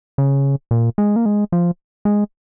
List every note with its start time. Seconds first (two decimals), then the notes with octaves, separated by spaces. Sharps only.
0.18 C#3
0.71 A#2
0.98 G#3
1.16 A#3
1.26 G#3
1.52 F3
2.05 G#3